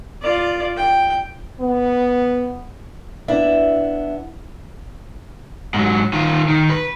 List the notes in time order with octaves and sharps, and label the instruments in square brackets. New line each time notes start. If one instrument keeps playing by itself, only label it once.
[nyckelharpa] F4 D5
G5
[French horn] B3
[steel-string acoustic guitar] B3 D4 E4 E5
[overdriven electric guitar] G#2 F#3
D#3 F4
D#3
B4